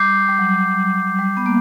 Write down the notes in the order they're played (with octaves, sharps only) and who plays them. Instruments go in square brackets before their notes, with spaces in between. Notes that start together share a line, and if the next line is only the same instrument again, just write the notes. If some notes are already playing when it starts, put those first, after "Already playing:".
Already playing: [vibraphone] G3 [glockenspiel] D6 G6 C7
[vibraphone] G3
F#3
G3
B3
A#3